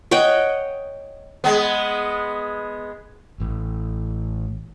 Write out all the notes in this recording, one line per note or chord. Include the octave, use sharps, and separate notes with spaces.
C#5 D#5 F#5 G5
G#3 B3
A1